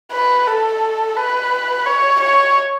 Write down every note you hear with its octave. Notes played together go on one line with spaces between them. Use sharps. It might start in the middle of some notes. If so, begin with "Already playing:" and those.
B4
A4
B4
C#5
C#5